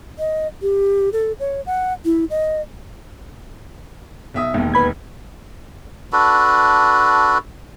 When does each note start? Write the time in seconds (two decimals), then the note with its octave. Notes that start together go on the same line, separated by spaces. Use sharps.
0.19 D#5
0.62 G4
1.13 A4
1.40 C#5
1.66 F#5
2.05 E4
2.30 D#5
4.34 B1 E5 D#6
4.54 E1 D#2
4.74 B4 B5 G#6
6.13 D4 F#4 A4 B4